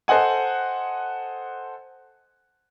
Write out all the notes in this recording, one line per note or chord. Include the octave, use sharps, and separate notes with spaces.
A4 C5 D#5 F#5 G#5